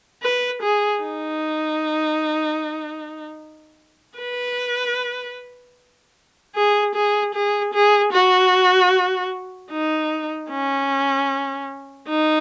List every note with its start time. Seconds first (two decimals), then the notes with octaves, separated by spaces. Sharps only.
0.22 B4
0.62 G#4
1.02 D#4
4.18 B4
6.55 G#4
6.95 G#4
7.34 G#4
7.74 G#4
8.13 F#4
9.72 D#4
10.50 C#4
12.09 D#4